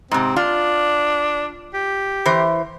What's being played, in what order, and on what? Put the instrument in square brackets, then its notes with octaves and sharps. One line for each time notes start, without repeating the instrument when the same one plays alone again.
[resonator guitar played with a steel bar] G#2 C3 [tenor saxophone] C4
[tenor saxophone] D4 [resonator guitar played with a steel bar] F4
[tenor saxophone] G4
[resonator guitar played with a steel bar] E3 C5